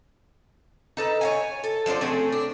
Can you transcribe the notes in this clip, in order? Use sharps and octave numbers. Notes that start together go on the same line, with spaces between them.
D#4 A4 B4
C#5 F5 G#5
A4
F3 F#3 D4 C5
A3 C4 C#4 G#4
D4